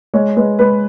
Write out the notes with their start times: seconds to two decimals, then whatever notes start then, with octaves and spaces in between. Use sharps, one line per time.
0.14 G#3 C#5
0.37 G#3 B4
0.59 G#3 B4